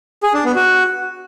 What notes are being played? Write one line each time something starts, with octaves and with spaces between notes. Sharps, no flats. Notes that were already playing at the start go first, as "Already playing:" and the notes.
G#4
D4
B3
F#4